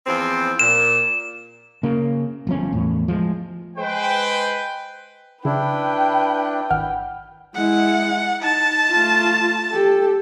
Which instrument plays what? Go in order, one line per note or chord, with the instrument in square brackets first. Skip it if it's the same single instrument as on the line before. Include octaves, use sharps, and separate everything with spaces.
[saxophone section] E2 F3 C4
[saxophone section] A#2 [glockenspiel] E7
[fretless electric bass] C#3 A#3
G1 F3 C#4
E2 A2
F3 G#3
[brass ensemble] G#3 B4 C5 G5
[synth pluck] C#3 [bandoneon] D4 E4 [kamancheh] B4 G5
[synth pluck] G#1 F#5 F6
[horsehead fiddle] G#3 E4 [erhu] F#5
[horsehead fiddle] D#4 [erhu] A5
[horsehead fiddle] A3 F4
G4 A4